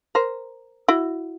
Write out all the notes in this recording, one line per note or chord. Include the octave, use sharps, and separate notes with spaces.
A#4 C5
E4 F#4